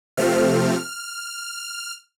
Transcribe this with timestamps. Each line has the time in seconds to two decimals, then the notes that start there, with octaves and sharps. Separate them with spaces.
0.17 C3 F3 A3 C4 F6